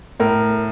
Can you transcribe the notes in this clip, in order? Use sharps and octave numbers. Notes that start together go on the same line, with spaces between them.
A2 A#4